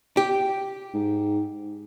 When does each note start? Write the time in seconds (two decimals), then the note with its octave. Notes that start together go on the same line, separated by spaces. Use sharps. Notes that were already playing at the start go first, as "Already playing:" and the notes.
0.17 G4
0.94 G#2